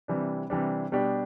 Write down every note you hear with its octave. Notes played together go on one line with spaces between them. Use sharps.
C3 E3 G3 D4
C3 E3 G3 D4
B2 G3 D4 G4